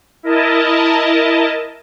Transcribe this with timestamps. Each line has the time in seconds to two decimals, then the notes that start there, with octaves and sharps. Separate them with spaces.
0.23 E4 A#4 D#5 A5